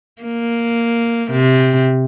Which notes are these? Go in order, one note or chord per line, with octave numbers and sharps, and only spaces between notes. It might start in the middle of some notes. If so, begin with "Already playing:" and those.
A#3
C3